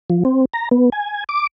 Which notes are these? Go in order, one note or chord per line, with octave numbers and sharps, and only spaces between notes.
F3
C4
A#5
B3
G#5
D6